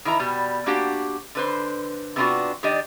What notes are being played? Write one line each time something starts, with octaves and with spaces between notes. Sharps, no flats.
D#3 E3 E4 A#5
B2 G3
A#3 D4 F#4 G4
D3 B4 C5
C3 F3 B3 D4 F4 F#4
D#3 D4 G4 D5 D#5